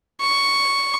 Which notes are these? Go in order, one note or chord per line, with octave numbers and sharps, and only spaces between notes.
C#6